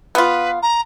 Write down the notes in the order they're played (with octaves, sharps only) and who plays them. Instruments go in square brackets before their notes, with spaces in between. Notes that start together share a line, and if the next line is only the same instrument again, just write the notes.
[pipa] B3 F4 [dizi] B4
[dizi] A#5